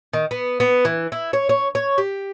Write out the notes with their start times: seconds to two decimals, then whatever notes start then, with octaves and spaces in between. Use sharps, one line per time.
0.13 D#3
0.31 B3
0.60 B3
0.85 E3
1.12 E4
1.33 C#5
1.49 C#5
1.75 C#5
1.98 G4